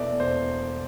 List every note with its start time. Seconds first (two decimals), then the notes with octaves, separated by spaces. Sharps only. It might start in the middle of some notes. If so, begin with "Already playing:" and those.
Already playing: E1 E2 B2 A3 D5 E5
0.20 E1 C5